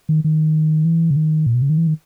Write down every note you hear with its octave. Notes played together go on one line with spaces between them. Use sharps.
D#3
D#3
E3
C#3
D#3
A#2
B2
C#3
D#3
E3
D#3